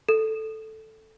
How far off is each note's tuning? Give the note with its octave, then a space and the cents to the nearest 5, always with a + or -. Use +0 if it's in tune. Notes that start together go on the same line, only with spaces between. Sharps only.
A4 +0